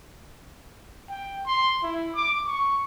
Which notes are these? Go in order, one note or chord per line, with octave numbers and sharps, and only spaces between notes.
G5
C6
E4
D6
C#6